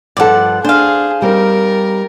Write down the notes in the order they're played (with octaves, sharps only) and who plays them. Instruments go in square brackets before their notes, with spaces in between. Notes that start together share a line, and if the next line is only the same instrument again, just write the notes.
[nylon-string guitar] G2 F3 A4 [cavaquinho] D5 F#5
[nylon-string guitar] D4 [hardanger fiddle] G#4 [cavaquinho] C5 F5
[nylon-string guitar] G3 C4 D#4 [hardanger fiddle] A#4